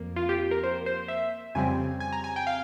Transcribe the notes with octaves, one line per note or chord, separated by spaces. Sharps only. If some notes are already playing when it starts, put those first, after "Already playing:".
Already playing: F2 A#3
F4
G4
A#4
C5
C5
E5
F2 C#3 G3 C4 G#5
G#5
A#5
G#5
G5
F5